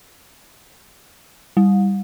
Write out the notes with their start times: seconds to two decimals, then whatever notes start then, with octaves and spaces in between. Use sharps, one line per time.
1.57 G3